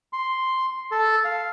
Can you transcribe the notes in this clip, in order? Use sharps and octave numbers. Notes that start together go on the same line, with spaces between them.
C6
A4
F5